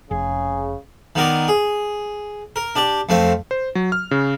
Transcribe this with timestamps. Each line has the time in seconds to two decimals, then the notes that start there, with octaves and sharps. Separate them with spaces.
0.11 F1 C#3 G#4
1.15 D#3 B3 A#4 D5
1.48 G#4
2.56 A#4
2.75 D4 G4 D5
3.09 F2 A3 C4 F5
3.51 C5
3.75 F#3
3.92 F6
4.11 C#3